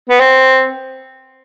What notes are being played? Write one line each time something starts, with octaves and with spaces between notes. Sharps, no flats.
B3
C4